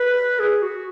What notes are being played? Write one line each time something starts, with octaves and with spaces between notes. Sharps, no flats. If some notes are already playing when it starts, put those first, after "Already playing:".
Already playing: B4
G#4
F#4